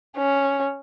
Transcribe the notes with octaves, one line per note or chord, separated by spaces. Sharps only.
C#4